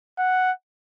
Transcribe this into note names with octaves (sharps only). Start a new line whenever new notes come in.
F#5